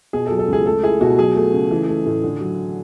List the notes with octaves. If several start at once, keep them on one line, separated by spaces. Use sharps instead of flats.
B2 G#4
A4
F#3
A4
C#2 G#4
A3 A4
E4 G#4
B2 F#4
F#3 G#4
A3
C#3
E3
A3
A2
D3
F#3